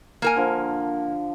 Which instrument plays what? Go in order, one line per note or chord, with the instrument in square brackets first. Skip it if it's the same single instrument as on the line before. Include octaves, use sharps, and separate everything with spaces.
[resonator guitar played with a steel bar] A#3 A#4 G#5
[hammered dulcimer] D3 F3